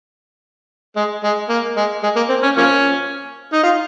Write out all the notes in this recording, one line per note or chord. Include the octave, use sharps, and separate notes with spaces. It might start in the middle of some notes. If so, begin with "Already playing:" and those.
G#3
G#3
A#3
G#3
G#3
A#3
C4
C#4
F3 A#3 C#4
D#4
F4